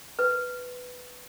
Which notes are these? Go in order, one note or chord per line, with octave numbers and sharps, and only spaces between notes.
B4